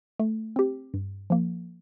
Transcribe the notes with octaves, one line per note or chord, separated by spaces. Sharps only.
A3
C4 G4
G2
F3 A#3